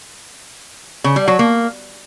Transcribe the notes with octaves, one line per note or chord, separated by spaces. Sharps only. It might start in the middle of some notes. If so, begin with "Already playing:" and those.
C#3
G3
F#3
A#3